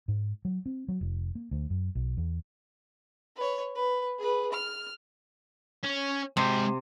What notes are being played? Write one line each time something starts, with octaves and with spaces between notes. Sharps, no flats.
G#2
F#3
C4
F#3
F1
A#3
D2
F#2
B1
E2
B4 C#5
B4
G#4 B4
F6
C#4
C3 G#3 G5